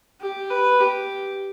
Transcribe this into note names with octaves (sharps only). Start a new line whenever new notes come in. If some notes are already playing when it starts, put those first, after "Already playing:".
G4
B4
G4